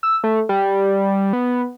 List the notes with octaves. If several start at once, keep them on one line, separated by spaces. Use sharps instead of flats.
E6
A3
G3
B3